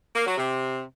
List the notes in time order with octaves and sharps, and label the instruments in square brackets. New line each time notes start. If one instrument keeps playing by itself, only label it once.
[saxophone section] A#3
F#3
C3